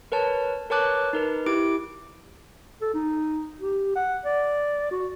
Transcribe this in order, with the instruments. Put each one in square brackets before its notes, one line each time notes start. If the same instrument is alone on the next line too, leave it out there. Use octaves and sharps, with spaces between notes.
[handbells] A#4 B4 C#5 A5
A#4 B4 C#5 A5 D6 F#6
D#4 A#4 B4
E4 G4 D6 D7
[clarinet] A4
D#4
G4
F#5
D5
F#4